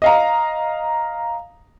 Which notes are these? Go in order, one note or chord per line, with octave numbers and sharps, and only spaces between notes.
D#5 F5 A#5